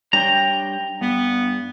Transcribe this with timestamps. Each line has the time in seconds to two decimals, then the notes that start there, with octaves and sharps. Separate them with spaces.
0.13 G3 D4 C#5 G5 A#5
1.01 G2 B3